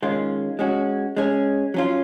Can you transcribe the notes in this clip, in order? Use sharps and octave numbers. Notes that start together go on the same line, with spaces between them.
D#3 G#3 C#4 F4
G#3 C#4 F#4
G#3 C#4 G#4
F#3 C#4 F4